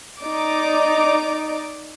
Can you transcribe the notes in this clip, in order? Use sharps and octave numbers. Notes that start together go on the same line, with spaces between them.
D#4 D5 D6